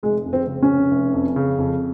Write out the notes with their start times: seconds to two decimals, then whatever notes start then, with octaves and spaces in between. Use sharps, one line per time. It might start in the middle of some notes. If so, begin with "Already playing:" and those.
0.03 F1 G#3
0.26 F2
0.33 C4
0.47 C#3
0.63 C#4
0.70 F1
0.91 F1
1.14 F2
1.36 C#3
1.58 F2